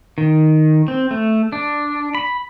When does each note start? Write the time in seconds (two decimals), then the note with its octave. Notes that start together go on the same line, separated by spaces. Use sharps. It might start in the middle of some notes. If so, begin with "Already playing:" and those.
0.18 D#3
0.88 C4
1.11 A3
1.52 D4
2.15 B5